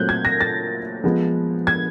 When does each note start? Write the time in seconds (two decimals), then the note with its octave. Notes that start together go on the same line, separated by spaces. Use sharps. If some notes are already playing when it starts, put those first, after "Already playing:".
Already playing: A#2 F#3 A3 C4 F#6 G6
0.09 G#6
0.25 A#6
0.41 A6
1.04 F3 G#3 B3
1.67 G#6